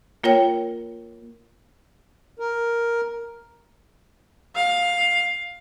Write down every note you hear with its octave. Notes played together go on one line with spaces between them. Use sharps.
A#3 F4 A#4 C#5 G5
A#4
F5